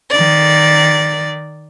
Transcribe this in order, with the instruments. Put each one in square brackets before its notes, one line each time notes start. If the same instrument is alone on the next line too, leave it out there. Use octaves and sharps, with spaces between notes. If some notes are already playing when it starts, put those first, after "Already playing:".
[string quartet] D#3 D5